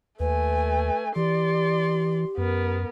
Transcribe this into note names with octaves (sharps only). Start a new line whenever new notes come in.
D#2 A3 B4 G#5
E3 G4 D5 C6
F#2 B3 A#4